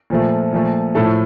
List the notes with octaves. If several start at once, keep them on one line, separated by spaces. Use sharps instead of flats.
A#2 F3 A3
A#2 F3 A3
A2 F3 A3 A4